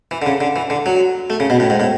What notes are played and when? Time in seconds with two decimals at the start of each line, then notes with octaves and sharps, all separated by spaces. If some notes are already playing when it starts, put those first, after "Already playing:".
0.11 E3
0.22 D3
0.26 C#3
0.40 D3
0.56 E3
0.70 D3
0.86 F#3
1.30 A3
1.40 C#3
1.50 B2
1.60 A2
1.70 G#2
1.80 A2